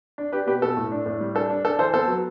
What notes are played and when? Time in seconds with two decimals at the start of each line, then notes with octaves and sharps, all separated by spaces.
0.18 D4
0.32 D4 G4 B4
0.47 B2 G4 B4
0.62 B2 A4
0.77 A2
0.92 D4
1.06 A2
1.21 G3
1.35 D4 A4
1.50 D4
1.65 D4 A4
1.79 E3 A4 C5
1.93 B3 A4 C5
2.08 F#3